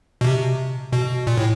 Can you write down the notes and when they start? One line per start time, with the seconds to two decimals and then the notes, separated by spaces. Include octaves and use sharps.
0.21 B2
0.24 C3
0.93 B2
1.27 A#2
1.38 A2